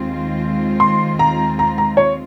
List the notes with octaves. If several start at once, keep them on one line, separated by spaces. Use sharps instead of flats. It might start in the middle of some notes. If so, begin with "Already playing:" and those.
Already playing: D#2 D#3 G#3 C4 F4
C6
A#5
A#5
A#5
C#5